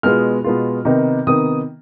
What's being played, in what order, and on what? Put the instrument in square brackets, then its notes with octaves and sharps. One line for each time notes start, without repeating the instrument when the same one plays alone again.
[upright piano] B2 G#3 B3 F4 F6
B2 G#3 B3 F4
C3 D#3 B3 D#4
C3 D#3 B3 D#4 D#6